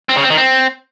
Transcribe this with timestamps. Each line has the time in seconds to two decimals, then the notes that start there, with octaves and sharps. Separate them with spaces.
0.09 C4
0.16 C#3
0.23 C4
0.30 D#3
0.37 C4